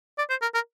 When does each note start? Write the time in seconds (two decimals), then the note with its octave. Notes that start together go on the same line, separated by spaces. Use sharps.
0.18 D5
0.30 C5
0.42 A#4
0.54 A#4